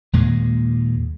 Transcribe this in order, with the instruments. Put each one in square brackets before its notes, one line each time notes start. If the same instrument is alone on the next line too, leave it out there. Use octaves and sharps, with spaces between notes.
[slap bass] D#2 A#2 G#3